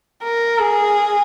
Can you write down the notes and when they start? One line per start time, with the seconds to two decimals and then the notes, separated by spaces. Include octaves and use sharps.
0.23 A#4
0.60 G#4